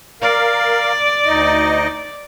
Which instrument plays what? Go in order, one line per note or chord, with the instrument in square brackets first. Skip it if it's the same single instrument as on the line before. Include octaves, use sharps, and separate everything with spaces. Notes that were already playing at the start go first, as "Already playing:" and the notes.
[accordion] A#4 F5 [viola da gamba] D5
[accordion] D2 D#4 D#5